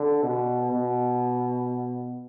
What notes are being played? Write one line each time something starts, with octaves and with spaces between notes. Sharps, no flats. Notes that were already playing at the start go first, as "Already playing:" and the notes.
Already playing: D3
B2
B2